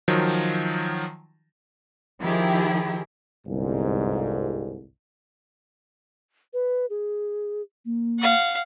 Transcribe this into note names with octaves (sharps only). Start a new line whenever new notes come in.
D#3 F3 F#3
D#3 F3 E4 G4 G#4
G1 C2 G#2
B4
G#4
A#3
F5 F#5